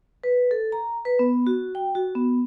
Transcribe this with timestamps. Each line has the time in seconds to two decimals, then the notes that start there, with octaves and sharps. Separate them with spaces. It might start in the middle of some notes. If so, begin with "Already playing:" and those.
0.24 B4
0.51 A4
0.72 A#5
1.05 B4
1.19 B3
1.47 F#4
1.75 G5
1.95 F#4
2.15 B3